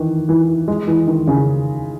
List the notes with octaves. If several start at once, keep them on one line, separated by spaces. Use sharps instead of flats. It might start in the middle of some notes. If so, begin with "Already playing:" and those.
Already playing: D#3 E3
E3
G#3
E3
D#3
C#3